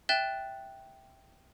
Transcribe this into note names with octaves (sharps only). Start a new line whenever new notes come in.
E5 G5 F#6 A6 E7 G7